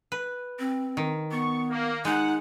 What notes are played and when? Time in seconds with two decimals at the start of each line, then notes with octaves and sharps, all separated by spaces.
0.12 B4
0.59 C4
0.97 D#3
1.31 B3 C#6
1.70 A#3
2.05 G#3 D#4 F#5